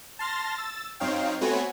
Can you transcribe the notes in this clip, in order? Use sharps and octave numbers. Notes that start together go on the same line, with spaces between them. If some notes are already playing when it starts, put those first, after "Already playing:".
A5 C6 F6 A6 A#6
E6 A6
F#2 C4 D#4 C#5 F5 G5
A3 B3 C4 F#4 C#5 G#5